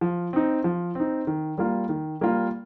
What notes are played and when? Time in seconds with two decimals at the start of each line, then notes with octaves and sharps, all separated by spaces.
0.01 F3
0.33 C4 D#4
0.64 F3
0.95 C4 D#4
1.27 D#3
1.58 G3 A#3 F4
1.89 D#3
2.21 G3 A#3 F4